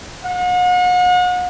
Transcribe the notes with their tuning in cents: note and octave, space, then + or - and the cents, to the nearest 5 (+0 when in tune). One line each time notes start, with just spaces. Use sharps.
F#5 -40